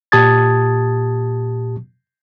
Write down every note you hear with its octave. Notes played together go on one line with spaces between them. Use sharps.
A#2 G4 A5 D#6 G#6 A6